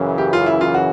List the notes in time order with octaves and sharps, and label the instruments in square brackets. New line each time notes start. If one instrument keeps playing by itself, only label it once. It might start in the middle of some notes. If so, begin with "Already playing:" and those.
Already playing: [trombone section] F#2 C#3 E3
[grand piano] G4
F4
E4
F4
F#4